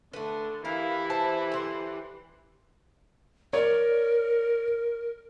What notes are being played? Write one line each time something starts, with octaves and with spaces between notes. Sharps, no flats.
D3 A3 B4
E3 E4 G4 A#4 F5
B4 C5 A5
D3 C5
A#4 C#5 D5